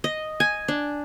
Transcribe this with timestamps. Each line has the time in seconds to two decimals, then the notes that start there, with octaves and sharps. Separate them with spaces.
0.04 D#5
0.40 G#5
0.68 D4